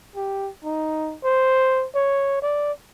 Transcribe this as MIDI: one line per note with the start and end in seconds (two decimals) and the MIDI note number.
0.16 0.51 67
0.64 1.16 63
1.24 1.86 72
1.95 2.39 73
2.42 2.72 74